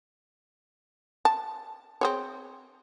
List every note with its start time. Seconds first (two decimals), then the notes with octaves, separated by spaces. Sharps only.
1.25 A5
2.01 C4 G#4 C#5